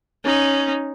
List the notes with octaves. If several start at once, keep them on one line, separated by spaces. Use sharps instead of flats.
C#4 D#4